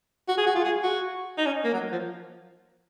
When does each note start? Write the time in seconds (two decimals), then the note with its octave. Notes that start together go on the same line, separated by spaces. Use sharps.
0.28 F#4
0.38 G#4
0.46 F#4
0.55 F4
0.64 G#4
0.83 F#4
1.38 D#4
1.46 C#4
1.64 A#3
1.73 F#3
1.92 F3